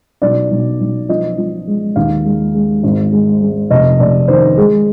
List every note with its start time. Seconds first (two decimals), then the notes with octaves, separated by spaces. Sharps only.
0.22 B1 D5
0.51 B1
0.80 B1
1.09 F3 D#5
1.38 F3
1.67 G#3
1.96 D#2 F5
2.25 G#3
2.54 G#3
2.83 G#1
3.12 G#3
3.42 G#3
3.70 F1 D#5
3.99 F1 D5
4.28 D#3 C5
4.57 G#3 G#4